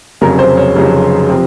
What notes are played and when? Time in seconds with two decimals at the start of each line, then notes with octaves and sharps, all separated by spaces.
0.21 F1 F2 C#3 F#3 A#4
0.39 C5
0.57 C#5
0.75 F1 F2 C#3 F#3
1.29 C3 F3 C4